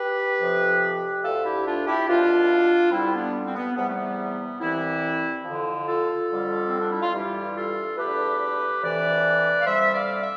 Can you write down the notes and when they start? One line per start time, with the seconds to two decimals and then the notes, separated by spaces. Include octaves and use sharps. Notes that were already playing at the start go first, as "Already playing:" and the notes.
Already playing: G4 B4
0.39 F2 C3 F3
1.23 D2 D3 A3 F4 A4
1.44 E4 G4
1.66 D4 F4
1.87 E4 G4
2.08 C2 B2 G3 D4 F4
2.92 G2 D3 G3 C4 E4
3.07 C4
3.13 B3 D4
3.46 C4
3.56 B3
3.76 E2 C3 G3 B3
3.87 A3
3.97 B3
4.60 C2 C3 E3 G3 C4 E4
5.45 F2 D3 F3
5.86 F4 A4
6.29 F2 D3 G3
6.67 C4
6.79 D4
6.90 E4
7.02 F4
7.14 G2 E3 G3 E4 G4
7.56 F4 A4
7.97 E2 D3 A3 G4 B4
8.82 D2 C3 E3 A3 B4 D5
9.60 F5
9.66 D2 C3 G3 C5 E5
9.94 D5 F5
10.22 E5